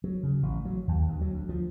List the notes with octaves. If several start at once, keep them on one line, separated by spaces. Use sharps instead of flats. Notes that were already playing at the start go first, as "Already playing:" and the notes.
F#3
C#3
A1
F#3
D#2
D2
F#3
D2
F3